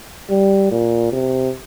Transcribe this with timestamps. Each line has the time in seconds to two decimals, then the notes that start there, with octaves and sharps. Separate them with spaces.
0.29 G3
0.71 A#2
1.12 C3